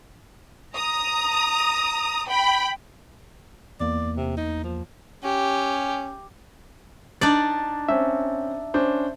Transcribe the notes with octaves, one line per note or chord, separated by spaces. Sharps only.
A#5 D#6
G5 B5
E2 A#3 D5
C3
D#4
F3
C#4 G4
D4 D#4 D5 A6
C4 C#4 E5
C#4 D4 C5